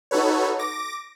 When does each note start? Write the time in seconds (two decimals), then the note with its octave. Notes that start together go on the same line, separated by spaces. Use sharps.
0.11 D#4 F#4 A4 B4 C#5
0.59 D6 A#6